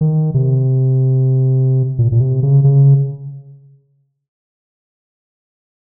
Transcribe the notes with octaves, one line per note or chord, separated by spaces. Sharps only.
D#3
C3
A#2
A#2
C3
C#3
C#3